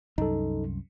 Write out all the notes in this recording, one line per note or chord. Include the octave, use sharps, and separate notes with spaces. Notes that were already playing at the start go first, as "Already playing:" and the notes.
C2 F#2 D#4 A4